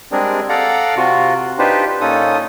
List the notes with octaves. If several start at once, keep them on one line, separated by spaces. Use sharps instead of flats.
G3 G#3 C4 D4 G#4 A#4
A4 D5 F5 F#5 A#5
C3 F4 F#4
D4 D#4 F4 G4 B4 C5
A#2 C#4 D#4 F4 A4 D#6